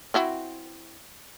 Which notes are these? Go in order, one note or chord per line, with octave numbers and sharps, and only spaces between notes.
C4 E4 F#4